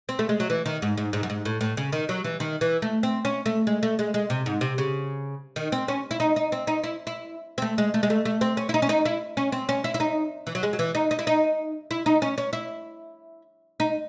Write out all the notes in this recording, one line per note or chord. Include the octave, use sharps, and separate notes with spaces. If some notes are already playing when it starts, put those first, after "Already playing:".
C4
A3
G#3
F#3
E3
D#3
G#2
G#2
G#2
F#2
G#2
A2
A2
C#3
D#3
F#3
E3
D#3
E3
A3
C4
C#4
A3
G#3
A3
G#3
G#3
C3
G#2
C3
C#3
D#3
C4
C#4
E4
D#4
D#4
C4
D#4
E4
E4
C4
A3
G#3
A3
G#3
A3
A3
C4
C#4
E4
D#4
C#4
D#4
E4
C#4
C4
C#4
E4
E4
D#4
E3
F#3
G#3
F#3
E3
D#4
D#4
E4
D#4
E4
D#4
C#4
C#4
E4
D#4